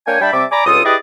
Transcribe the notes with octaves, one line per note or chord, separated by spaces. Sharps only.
A#3 D4 C#5 G5 G#5
G3 D4 E5 G5 A5 B5
C3 G3 C4 E5 A5 D6
D5 G#5 A#5 B5 D6
C#2 G2 F4 A4 D#6
E4 G4 G#4 B4 D5 D#5